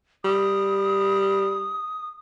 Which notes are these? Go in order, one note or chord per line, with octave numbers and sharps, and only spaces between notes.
G3 D#6